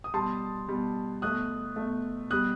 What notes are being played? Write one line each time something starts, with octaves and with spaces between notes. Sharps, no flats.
D#6
B2 G3 A5 C6
B2 G3
B2 A3 D#6 F#6
B2 A3
B2 G3 D#6 F#6